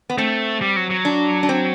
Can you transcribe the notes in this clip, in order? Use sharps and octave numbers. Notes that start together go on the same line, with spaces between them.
B3
A3 C4
G3
F#3
F#3
D4
D4
C4